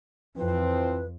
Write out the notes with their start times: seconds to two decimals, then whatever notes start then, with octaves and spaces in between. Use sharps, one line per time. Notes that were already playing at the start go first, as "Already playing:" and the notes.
0.37 F2 E3 F3 C4 B4